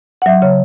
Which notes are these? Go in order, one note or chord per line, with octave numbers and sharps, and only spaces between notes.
F#5
F#3 E5
C#3 C#5